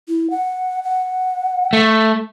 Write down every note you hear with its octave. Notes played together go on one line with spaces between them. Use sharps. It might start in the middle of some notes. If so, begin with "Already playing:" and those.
E4
F#5
F#5
A3